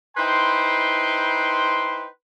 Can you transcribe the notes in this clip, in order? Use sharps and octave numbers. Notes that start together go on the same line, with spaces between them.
D#4 E4 B4 C5 G5 C6